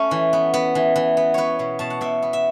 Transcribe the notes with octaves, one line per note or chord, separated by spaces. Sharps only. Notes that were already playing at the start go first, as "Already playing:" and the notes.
Already playing: A3 C#4
E3
B3
B3
E3
E3
B3
B3 B4 C#5
B2
B2 A5
F#5
B2 E5
B3
E5